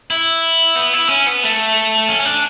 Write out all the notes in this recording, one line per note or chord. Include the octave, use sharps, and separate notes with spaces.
E4
B3
E4
C#4
B3
A3
C#4
C#4
D4